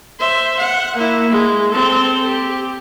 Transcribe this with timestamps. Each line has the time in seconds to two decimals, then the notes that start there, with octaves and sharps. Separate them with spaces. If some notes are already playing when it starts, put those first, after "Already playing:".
0.19 C5 E5
0.59 F#5
0.96 A#3 E4
1.30 G#3
1.69 C4 A4
2.26 G4